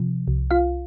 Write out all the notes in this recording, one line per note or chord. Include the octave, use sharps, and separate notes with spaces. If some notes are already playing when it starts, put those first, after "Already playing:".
Already playing: C3 F3
C2
F4 F5